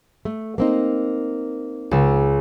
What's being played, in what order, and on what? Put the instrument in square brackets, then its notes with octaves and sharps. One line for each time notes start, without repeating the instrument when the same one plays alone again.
[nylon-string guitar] A3
A#3 C4 D#4
[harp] C#2 G#3 E6